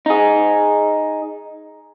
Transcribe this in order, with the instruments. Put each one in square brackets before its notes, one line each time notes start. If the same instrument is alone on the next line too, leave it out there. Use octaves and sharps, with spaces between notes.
[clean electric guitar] D#4 G#4